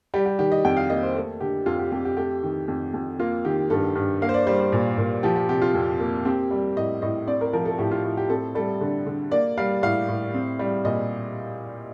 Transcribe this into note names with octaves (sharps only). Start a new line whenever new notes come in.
G3 G4
G4
D#3 G4
D#5
F2 G5
F5
A#3 D#5
C5
A3
D3 G4
F2 F4
G4
F2 G4
G4
A3 G4
D#3
F2
F2
A#3 F4
D#3 G4
G2 A4
G2
A#3 F5
C5
D5
G3 C5
C5
A#2
A#2
F3 G4
G4
C3 G4
F4
F2
A#3
C4 G4
G3
A2 D#5
A2 D#5
C4 D5
A#4
F3 A#4
A4
A2 G4
F4
A2
G4
C4 A4
G3 A4
D3
D3
A#3 D5
G3 F5
A2 F5
A2
C4
G3
A#2 D#5